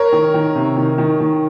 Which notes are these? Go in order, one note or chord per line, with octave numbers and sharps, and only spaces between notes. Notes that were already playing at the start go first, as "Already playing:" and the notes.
Already playing: A#4 C#5
D#3
D#3
C3
D#3
D#3
D#3